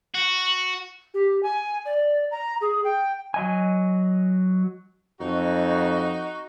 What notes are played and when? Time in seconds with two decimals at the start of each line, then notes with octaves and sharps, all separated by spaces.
0.15 F#4
1.14 G4
1.43 G#5
1.85 D5
2.31 A#5
2.61 G#4
2.84 G5
3.34 F#3 D#5 G#5
5.20 F2 D#4 F#4